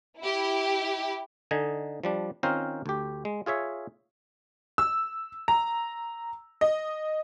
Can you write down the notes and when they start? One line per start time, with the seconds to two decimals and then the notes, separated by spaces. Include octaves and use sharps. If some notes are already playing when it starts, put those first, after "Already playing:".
0.18 E4 G4
1.51 D3 D#4 D#5 G#5
2.03 F3 G3 D4
2.43 D#3 C4 C#4 F4 A#4 C5
2.86 D2 G4
3.25 G#3
3.46 F4 G#4 C#5 E5
4.78 E6
5.48 A#5
6.61 D#5